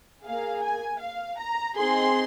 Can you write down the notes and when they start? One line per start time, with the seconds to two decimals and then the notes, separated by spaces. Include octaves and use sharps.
0.24 A#3 G#4 F5
0.62 G#5
1.00 F5
1.38 A#5
1.76 C4 D#4 G#4 C6